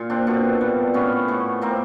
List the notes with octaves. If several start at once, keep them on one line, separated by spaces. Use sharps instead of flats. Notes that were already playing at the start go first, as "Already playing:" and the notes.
Already playing: A#2 F4
C4 D4
B2 C4 D4
G3
A2 B3 C#4
A2
A2 A#3 C4